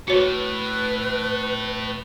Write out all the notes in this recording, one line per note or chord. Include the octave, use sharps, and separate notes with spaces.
A2 F#4 B4 C#5